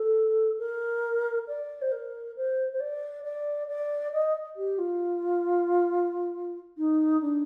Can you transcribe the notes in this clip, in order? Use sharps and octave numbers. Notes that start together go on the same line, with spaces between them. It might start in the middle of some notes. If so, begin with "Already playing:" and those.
Already playing: A4
A#4
D5
C5
A#4
C5
C5
D5
D5
D5
D#5
G4
F4
D#4
D4